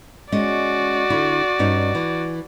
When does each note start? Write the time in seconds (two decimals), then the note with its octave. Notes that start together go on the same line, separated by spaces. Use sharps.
0.32 G#3 C#4 F#4 D5 D#5
1.10 D3 E4
1.59 G2 C#4 D#4
1.95 E3